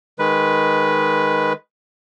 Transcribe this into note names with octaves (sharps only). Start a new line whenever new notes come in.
D#3 G#3 B4